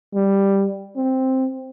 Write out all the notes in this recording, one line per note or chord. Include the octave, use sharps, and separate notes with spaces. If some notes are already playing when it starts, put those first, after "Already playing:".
G3
C4